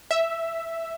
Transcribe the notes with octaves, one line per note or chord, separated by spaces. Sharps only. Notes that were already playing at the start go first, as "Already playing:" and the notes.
E5